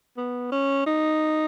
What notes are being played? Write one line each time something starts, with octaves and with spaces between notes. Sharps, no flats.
B3
C#4
D#4